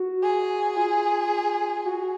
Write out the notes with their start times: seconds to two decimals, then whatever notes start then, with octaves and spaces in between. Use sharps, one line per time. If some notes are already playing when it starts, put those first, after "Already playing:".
Already playing: F#4
0.23 G#4
0.77 F4
1.86 F#4